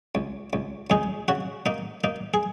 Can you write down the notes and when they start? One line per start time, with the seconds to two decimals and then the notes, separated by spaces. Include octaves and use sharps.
0.15 C#2
0.53 C#2
0.90 C#2 D#4 G#4
1.28 C#3 F#4
1.66 A#3 D#4
2.04 A#3 D#4
2.34 G#4